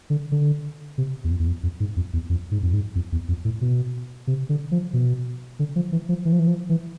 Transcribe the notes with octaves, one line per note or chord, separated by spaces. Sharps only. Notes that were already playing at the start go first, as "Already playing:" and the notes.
D3
D3
C3
E2
F2
E2
F2
F2
G#2
F2
E2
F2
G#2
F2
G#2
F2
E2
F2
A2
B2
C3
D3
F3
B2
D3
F3
E3
F3
E3
F3
E3
F3
E3